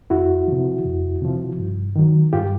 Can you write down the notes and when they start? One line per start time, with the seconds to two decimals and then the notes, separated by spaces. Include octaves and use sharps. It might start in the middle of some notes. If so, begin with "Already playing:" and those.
0.10 F2 E4 F#4
0.48 C3 F3
0.85 F2
1.22 C3 F3
1.59 G2
1.96 D#3 F#3
2.33 G2 F4 G4